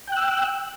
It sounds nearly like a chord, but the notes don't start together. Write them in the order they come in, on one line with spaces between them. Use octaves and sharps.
G5 F#6 E6